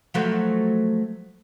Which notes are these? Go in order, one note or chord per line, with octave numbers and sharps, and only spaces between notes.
F3 F#3 A3